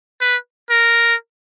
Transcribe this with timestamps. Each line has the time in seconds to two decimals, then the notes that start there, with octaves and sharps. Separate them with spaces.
0.21 B4
0.70 A#4